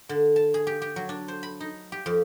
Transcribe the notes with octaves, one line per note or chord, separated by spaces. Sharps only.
D3
A5
G#4
G4
G4
F#3
D4
C5
B5
D#4
G4
F2